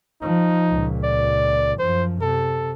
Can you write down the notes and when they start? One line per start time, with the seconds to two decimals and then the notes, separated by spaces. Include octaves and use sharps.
0.22 F3 D#4
0.69 C#2 A#2
1.04 D5
1.79 F#2 F3 C5
2.21 C3 A4